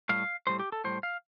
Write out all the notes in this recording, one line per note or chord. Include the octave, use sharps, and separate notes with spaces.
A2 G3 F5
A2 G3 C5
G4
A4
A2 G3 C5
F5